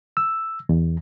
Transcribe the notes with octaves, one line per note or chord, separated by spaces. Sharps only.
E6
E2